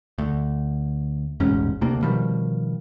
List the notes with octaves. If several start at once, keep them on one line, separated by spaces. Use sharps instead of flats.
D2
E1 A1 G#2 C#4
D2 C3 A#3 D4
B2 D#3 F3 G3